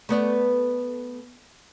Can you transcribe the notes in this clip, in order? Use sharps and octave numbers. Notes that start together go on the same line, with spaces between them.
A3 B3 D5